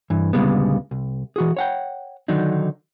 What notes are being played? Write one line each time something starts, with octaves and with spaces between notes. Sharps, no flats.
G2 E3
D2 A#2 C#3 G3 G#3 B3
C2
E3 F#4 G#4
C#5 F#5 G5
D3 D#3 F#3 D4 D#4